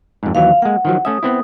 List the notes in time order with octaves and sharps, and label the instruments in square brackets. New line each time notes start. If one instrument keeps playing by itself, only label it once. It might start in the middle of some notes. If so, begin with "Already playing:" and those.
[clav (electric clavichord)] F2 G#2
[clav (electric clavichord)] D#2 E3 F#3 [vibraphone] F5
[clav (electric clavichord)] G#3 A#3 [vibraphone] F#5
[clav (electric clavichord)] D#3 F3 F#3
[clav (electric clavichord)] A3 C#4 E5 [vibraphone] D#6
[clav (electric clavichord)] B3 C4 E4